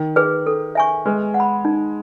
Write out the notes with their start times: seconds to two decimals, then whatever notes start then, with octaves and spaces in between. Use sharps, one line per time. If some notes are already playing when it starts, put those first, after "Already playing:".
Already playing: D#3
0.16 G#4 B4
0.47 A4
0.75 E5 G#5 C#6
1.05 G#3 B4
1.34 F#5
1.40 B5
1.65 D#4